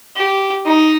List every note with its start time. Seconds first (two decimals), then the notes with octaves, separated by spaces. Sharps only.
0.16 G4
0.65 D#4